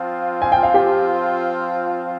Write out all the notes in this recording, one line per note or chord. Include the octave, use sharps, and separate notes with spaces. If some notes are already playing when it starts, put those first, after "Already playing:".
Already playing: F3 C4 F4
G#5
G5
F5
G4 G5